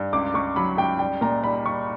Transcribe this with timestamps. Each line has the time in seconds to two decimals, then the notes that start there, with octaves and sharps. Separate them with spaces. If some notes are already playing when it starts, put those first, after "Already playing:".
Already playing: G2
0.13 C#2 D6
0.34 C#2 C#6
0.56 F#3 B5
0.77 C#2 G5
0.99 G3 G5
1.21 A#2 A#5
1.43 G3 B5
1.65 G3 C#6